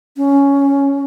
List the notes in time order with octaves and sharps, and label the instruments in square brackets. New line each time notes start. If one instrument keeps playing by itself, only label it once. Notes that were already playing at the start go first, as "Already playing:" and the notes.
[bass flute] C#4